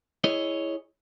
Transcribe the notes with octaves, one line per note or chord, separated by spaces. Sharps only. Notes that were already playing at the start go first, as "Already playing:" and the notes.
E4 G#4 C#5 D#5